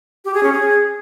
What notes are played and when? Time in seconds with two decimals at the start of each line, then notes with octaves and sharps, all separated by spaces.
0.25 G4
0.34 G#4
0.43 C#4
0.52 G#4